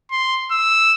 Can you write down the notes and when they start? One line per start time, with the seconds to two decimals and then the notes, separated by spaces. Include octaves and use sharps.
0.11 C6
0.52 E6